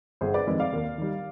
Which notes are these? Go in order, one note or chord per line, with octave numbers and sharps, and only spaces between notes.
G1 G#4 C5
B4 D5
F2 D#3 G#3
D5 F5
D#2
D#3 G3